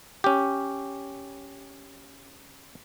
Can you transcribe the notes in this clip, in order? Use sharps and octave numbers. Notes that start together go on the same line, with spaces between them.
C#4 G4